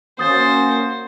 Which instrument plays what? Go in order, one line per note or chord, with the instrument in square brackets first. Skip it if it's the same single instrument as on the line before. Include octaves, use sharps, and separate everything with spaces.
[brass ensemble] A#3 C#4 F#4 [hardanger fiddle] C5 [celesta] D#6 A6